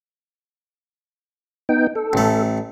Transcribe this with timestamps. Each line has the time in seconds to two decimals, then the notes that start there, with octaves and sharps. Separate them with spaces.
1.69 B3 D#4 G5
1.95 A4
2.13 A1 A3